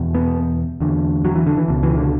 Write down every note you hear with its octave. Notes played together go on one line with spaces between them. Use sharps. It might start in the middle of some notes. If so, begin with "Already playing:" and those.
Already playing: E2 B2
B3
E2 D3
F#3
E3
D3
E3
C#2 B2
E3
D3